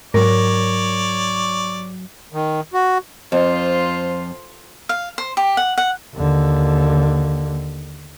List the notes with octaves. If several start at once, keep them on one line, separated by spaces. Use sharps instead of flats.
G#2 F#3 A#4 C#5 D5 A#6
D#3
F#4
F2 F4 C5
F5
C5
G4
F#5
F#5
D#2 D3